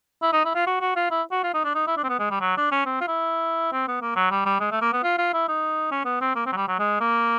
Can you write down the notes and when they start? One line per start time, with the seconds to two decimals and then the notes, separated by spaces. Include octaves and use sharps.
0.23 E4
0.33 D#4
0.45 E4
0.55 F4
0.67 F#4
0.81 F#4
0.96 F4
1.11 E4
1.32 F#4
1.44 F4
1.54 D#4
1.64 D4
1.75 D#4
1.87 E4
1.97 D4
2.04 C4
2.09 B3
2.19 G#3
2.31 G3
2.41 F#3
2.57 D4
2.72 C#4
2.86 C4
3.01 F4
3.08 E4
3.72 C4
3.88 B3
4.02 A#3
4.16 F#3
4.31 G3
4.46 G3
4.60 G#3
4.72 A3
4.81 A#3
4.93 B3
5.03 F4
5.18 F4
5.33 E4
5.48 D#4
5.92 C#4
6.05 B3
6.21 C4
6.35 A#3
6.46 C4
6.53 F#3
6.56 G3
6.68 F#3
6.79 G#3
7.01 A#3